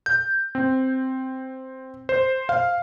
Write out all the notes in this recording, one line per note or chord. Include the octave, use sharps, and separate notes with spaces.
G6
C4
C5
F5